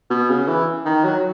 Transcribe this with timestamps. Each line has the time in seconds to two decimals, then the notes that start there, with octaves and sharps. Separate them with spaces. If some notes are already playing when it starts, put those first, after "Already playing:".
0.10 B2
0.29 C#3
0.48 E3
0.85 D#3
1.04 F#3